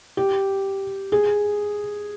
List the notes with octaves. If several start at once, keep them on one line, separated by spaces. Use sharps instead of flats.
G4
G#4